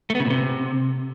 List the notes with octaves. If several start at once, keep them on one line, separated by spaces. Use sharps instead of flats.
A3
B3
C#3
A#2
C3